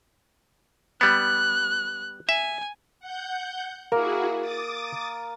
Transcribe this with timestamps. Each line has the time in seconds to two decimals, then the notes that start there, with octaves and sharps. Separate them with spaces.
1.01 G3 B3 F#6
2.29 E5 G#5
3.00 F#5 G6
3.92 A#3 E4 F#4 G#4 A#4
4.40 D6 D#6 A6